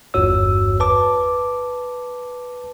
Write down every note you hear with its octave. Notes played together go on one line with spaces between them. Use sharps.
G1 E2 G2 F#4 C#5 E6
B4 A5 D6